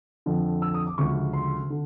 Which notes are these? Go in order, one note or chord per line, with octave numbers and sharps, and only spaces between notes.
F2 D3 F3
E6
D#6
D6
D2 C#3 F3 G#3 C#6
C6
D3